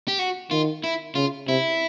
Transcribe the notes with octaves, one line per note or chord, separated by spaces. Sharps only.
G4
F#4
D#3 F4
E4
C#3 F4
C3 E4